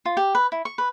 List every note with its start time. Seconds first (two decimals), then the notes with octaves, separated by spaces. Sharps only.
0.05 F4
0.17 G4
0.35 B4
0.52 E4
0.65 C#6
0.78 B4